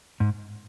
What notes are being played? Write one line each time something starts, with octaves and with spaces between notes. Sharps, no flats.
G#2